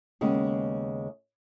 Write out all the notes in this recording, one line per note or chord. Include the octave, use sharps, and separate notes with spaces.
D#2 C#3 G#3 B3